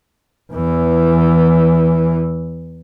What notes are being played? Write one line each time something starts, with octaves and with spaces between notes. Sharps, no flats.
E2 E3